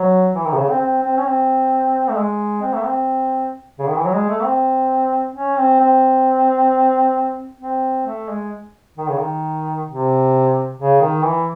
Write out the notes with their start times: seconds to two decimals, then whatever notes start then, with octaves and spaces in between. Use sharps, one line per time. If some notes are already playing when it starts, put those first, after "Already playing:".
Already playing: F#3
0.36 E3
0.46 D#3
0.53 C3
0.57 C#3
0.70 C4
0.80 C4
1.03 C4
1.18 C#4
1.26 C4
2.09 A3
2.17 G#3
2.62 C4
2.74 A3
2.85 C4
3.79 C#3
3.88 D#3
3.97 E3
4.05 F#3
4.14 G#3
4.29 A3
4.44 C4
5.35 C#4
5.57 C4
5.80 C4
7.61 C4
8.07 A3
8.29 G#3
8.98 D#3
9.09 C#3
9.18 D#3
9.88 C3
10.79 C#3
11.01 D#3
11.24 E3